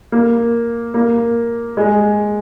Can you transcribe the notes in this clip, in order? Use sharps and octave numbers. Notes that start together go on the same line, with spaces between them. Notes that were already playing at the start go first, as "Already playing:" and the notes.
A#3
A#3
G#3